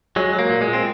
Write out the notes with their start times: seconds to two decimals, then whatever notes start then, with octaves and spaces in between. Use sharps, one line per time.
0.16 F#3 G#3
0.33 F#3
0.39 A#3
0.50 A#2
0.61 G#3
0.68 A#2
0.73 C4